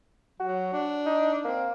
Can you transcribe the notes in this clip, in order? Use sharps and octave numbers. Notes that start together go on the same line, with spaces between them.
F#3 F#4
D4
D#4
A#3 C4